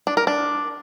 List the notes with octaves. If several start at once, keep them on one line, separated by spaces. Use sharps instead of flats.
D4
A#4
D4